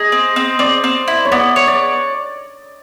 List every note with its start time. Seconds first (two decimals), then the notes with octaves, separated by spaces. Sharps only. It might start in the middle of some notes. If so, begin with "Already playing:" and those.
Already playing: G#4 D#5
0.12 C4
0.36 C4
0.59 C4 D5
0.84 C4
1.08 E4
1.25 C#5
1.32 B3 D5
1.56 C#5
1.67 D5